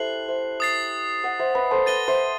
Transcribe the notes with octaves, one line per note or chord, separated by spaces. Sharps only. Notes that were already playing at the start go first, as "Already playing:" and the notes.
Already playing: E4 G4 A4 C5 F#6 C7 F#7
C5 E5
D#6 A6 C7
D#5 F#5
C5 E5
B4 D#5
A4 C5
B4 D#5 A6 D#7 G7
C5 E5